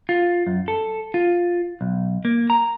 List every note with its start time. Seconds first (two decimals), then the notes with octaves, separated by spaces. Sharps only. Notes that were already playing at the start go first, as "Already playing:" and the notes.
0.09 F4
0.47 F#2
0.68 A4
1.14 F4
1.81 B1
2.25 A#3
2.50 A#5